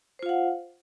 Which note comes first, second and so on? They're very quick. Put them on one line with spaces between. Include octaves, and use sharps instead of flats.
C5 F4 F5 F#5